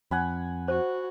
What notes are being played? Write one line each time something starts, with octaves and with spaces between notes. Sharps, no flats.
F2 F#5 G#5 B5
F#4 C5